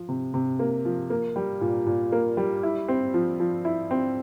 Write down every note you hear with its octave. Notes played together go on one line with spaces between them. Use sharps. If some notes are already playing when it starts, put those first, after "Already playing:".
Already playing: F3
C3
C3
A#3
F3
A#3
G3
A#2
A#2
A#3
G3
E4
C4
F3
F3
E4
C4